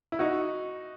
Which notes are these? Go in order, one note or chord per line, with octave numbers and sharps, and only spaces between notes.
E4
D#4 F#4